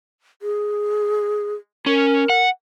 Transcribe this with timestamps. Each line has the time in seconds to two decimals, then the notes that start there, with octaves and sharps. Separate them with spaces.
0.42 G#4
1.86 C#4 A#4
2.30 F#5